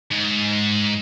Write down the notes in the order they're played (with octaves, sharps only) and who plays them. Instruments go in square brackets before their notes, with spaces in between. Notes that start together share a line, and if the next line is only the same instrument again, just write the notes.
[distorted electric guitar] G#2